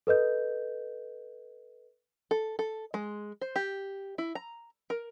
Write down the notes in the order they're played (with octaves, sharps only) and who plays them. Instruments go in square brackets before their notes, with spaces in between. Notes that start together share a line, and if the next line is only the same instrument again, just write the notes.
[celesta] A4 B4 D#5 G6
[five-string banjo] A4
A4
G#3
C5
G4
E4
A#5
A#4